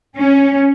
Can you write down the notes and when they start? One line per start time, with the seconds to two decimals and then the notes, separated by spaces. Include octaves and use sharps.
0.16 C#4